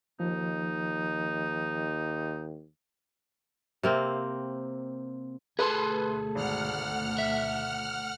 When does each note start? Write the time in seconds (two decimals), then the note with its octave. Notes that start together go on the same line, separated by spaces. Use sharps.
0.20 D#2 F3 D#4
3.83 C3 A#3 C4
5.59 D2 B2 A3 G#4 A4 B4 C6
6.35 G#1 F#5 F6
7.18 E5